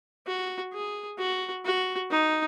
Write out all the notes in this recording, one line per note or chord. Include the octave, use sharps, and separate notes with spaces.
F#4
G#4
F#4
F#4
D#4